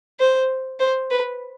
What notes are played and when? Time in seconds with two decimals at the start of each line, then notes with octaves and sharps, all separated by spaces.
0.20 C5
0.80 C5
1.10 B4